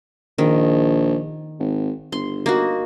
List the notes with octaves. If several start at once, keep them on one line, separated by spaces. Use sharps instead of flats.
A#1 D#3
G#1
G1 C6
A#3 D#4 F#4